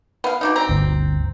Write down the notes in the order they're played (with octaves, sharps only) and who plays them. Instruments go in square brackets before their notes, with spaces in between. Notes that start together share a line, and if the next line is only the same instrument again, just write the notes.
[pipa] B3 F5
B2 D4 D#4
C4 A#5
[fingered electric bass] G1 D2